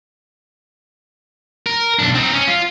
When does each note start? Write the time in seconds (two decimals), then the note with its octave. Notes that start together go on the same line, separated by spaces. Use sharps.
1.67 A#4
1.99 B1 D4
2.15 C4 D#4
2.33 C#4
2.48 F4